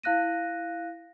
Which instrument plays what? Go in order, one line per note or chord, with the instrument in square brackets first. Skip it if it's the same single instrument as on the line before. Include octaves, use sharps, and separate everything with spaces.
[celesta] E4 F5 F#6 A#6 D#7